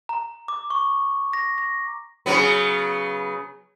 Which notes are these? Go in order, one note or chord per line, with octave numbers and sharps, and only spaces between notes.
A#5
D6
C#6
A#6
A#6
C#3 F#3 B3